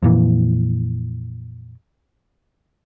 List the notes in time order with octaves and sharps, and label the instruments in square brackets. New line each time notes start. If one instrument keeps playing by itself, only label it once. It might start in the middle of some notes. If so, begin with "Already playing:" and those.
[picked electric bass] F2 A#2 E3